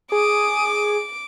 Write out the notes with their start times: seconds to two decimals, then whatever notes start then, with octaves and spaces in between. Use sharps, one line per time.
0.12 G#4 D6 D#6